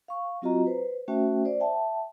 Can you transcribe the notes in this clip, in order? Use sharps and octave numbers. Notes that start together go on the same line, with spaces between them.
F5 C#6
F#3 C4 F4 F#4 D#5 A#5
B4 C5
A3 C#4 F#4 C5 E5 G5
C5 D5
E5 G5 A5